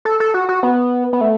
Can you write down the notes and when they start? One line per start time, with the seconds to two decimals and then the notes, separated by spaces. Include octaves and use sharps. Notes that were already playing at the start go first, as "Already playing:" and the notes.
0.05 A4
0.20 A4
0.34 F#4
0.49 F#4
0.63 B3
1.13 B3
1.21 A3